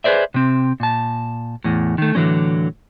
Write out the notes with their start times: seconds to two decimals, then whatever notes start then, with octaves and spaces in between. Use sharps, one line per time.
0.04 G#4 B4 C5 D5 E5
0.34 C3 C4
0.80 A#2 A5
1.64 E2 A2
1.98 D#3 A3
2.15 A2 D3 E3 F#3 C#4